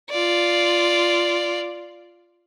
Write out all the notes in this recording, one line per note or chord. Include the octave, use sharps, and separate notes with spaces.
F4 D5